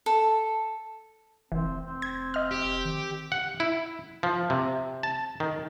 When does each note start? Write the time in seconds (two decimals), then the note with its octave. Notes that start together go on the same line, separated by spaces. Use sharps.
0.06 A4
1.52 F1 E3 C4
1.84 C4
2.02 G#6
2.34 D#5 F6
2.51 G4
2.85 D#3
3.32 F#5
3.60 E4
4.23 F3
4.50 C3
5.03 A5
5.40 D#3